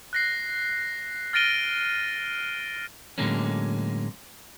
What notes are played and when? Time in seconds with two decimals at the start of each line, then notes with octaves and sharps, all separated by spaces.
0.13 F#6 A#6 C7
1.33 F6 A6 A#6 D7 D#7 G7
3.18 A2 D3 F#3 G#3 A#3 C#4